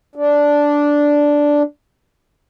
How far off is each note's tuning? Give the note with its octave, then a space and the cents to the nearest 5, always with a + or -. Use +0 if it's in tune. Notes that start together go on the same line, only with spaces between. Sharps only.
D4 -5